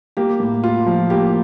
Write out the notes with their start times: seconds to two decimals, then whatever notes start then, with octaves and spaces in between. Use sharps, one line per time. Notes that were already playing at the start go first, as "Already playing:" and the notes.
0.17 A#3 G4
0.40 A2
0.64 F4
0.86 F3
1.10 A#3 G4